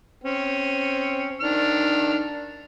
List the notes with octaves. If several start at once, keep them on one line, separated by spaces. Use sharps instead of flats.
C4 C#4
D#3 D4 F6